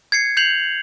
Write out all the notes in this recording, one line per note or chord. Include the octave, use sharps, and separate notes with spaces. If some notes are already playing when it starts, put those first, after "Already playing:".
G#6 C7 C#7
G6 C7 F7 F#7